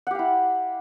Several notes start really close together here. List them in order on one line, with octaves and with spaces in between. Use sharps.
F#5 G4 F5 E4